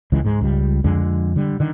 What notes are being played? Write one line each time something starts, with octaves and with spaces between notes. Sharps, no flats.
C#2 C#3 E3 G#3
G#2 G#3
C#2 G3
F2 D3 G#3
D3 G3
D3 D#3